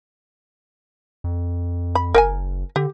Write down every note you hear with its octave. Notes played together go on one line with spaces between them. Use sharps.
F2
B5
F#1 A#4 G5 G#5
D3 G4